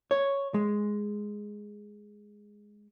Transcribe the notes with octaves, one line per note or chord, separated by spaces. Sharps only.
C#5
G#3